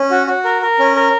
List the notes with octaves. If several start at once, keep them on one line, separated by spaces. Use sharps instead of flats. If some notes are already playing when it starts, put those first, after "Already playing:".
Already playing: C#4
F#4
F#4
A#4
A#4
C#4
A#4